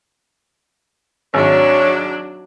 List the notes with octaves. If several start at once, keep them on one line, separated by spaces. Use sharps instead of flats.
G#1 F#3 D4 C#5